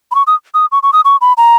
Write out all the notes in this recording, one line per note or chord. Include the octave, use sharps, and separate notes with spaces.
B5
C#6
D#6
D#6
C#6
C#6
D#6
C#6
B5
A#5